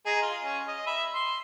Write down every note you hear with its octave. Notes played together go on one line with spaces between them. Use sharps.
G#3 G#4 A#5
F4
C#4
D#5
E5 B5
C6